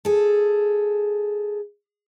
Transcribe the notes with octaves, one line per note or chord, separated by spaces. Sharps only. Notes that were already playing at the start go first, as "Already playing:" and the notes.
G#4 A4